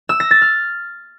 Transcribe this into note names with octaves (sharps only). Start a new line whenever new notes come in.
E6
A#6
A6
F6